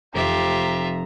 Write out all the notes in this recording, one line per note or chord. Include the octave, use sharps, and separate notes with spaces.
F1 F4 G4 E5 A#5